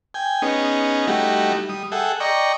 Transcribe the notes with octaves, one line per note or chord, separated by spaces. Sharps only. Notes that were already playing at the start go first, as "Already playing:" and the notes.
G5 G#5
B3 C#4 D#4 G#4
G3 A3 D#4 E4 F#4 G4
G3 D#6
G#4 A4 E5 F#5 G5
D5 D#5 G5 A#5 C#6